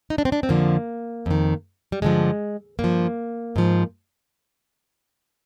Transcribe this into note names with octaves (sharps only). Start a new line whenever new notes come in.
D#4
D4
C4
D4
C4
F2 D3 F3 A#3
F2 D#3
G3
G2 D3 F3 G#3
G2 A#3
F3
G#2 F3